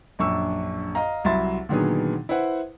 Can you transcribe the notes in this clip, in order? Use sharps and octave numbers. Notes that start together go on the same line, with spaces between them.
A#1 F#2 D4 C#6 E6
D#5 F5 A#5
C2 F#3 E5 B5 C6 A6
A#2 D3 D#3 F#3 B3 G#4
E4 B4 C5 F#5